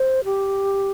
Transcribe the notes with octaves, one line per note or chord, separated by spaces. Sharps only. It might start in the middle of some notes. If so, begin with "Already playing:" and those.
Already playing: C5
G4